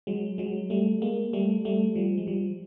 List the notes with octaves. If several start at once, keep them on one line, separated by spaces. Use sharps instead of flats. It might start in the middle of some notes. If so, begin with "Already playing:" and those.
F#3 G#3
F#3 G#3
G3 A3
G#3 A#3
G3 A3
G3 A3
F3 G3
G#3
F3 G3